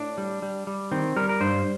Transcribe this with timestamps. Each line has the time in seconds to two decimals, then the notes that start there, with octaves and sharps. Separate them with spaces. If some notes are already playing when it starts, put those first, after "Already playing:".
Already playing: A2 D4
0.18 G3
0.42 G3
0.67 G3
0.92 D#3 C4
1.16 G3 A#4
1.29 A#4
1.41 G2 C5